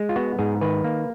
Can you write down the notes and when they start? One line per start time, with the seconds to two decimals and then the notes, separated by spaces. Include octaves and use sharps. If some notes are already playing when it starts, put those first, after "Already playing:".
Already playing: G#3
0.09 F4
0.16 B3 F#4
0.39 G#2 G#4
0.61 D#3 B4
0.84 A#3